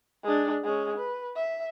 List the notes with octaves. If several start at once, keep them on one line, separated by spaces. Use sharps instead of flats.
G#3 D4
G#3 C#4
B4
E5